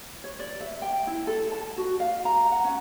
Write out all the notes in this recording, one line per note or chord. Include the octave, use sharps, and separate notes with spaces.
C#5
D5
E5
G5
E4
A4
A5
F#4
F5
A#5
F#5
C#4